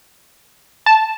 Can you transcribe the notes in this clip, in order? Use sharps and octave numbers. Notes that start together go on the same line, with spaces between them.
A5